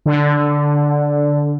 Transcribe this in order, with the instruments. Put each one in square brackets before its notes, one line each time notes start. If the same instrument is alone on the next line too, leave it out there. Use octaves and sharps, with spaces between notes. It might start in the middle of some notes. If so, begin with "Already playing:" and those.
[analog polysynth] D3